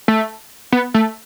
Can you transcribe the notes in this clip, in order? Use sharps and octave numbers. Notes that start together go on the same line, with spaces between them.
A3
B3
A3